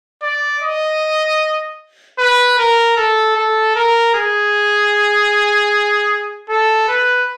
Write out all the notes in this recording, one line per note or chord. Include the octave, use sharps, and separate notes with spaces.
D5
D#5
B4
A#4
A4
A4
A#4
G#4
A4
B4